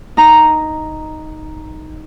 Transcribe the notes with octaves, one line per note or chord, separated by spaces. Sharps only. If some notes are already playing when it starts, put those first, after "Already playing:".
D#4 A#5